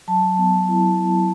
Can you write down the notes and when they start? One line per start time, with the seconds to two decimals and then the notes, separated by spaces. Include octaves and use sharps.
0.08 F#3 A5
0.23 F#3
0.38 B3
0.53 F#3
0.68 E4
0.83 E4